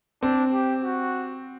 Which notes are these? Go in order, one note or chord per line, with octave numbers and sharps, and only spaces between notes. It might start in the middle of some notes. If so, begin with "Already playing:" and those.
C4 D4
G4
F#4